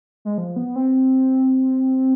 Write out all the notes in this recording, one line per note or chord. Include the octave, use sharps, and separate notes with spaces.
G#3
F3
B3
C4